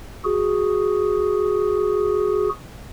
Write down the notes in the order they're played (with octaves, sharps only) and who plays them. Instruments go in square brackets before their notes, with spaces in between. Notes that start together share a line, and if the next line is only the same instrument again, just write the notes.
[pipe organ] F#4 G#4